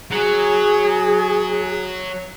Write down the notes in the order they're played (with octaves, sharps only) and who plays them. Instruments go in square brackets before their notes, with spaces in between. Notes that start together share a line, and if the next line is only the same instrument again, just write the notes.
[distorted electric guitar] F#3 [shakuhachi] G#4